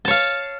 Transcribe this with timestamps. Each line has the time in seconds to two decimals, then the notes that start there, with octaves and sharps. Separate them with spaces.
0.05 A5
0.08 C#5
0.11 F5